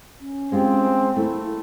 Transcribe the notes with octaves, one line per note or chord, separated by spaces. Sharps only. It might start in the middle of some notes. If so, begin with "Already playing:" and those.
C#4
G#3 C4 F4 G4
A3 A#3 E4